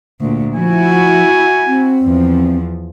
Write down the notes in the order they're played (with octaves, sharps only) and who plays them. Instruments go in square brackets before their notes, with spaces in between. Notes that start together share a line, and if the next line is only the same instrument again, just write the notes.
[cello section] D2 A#2
[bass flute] F3 [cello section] E4 F#4 [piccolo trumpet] G#5
[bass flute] C4
[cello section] E2 F3